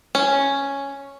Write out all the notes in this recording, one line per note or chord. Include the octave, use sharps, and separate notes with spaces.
C#4